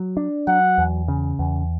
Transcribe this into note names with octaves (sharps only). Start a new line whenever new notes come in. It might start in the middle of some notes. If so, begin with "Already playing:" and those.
Already playing: F#3
D4
F#3 F#5
E2
C#3
E2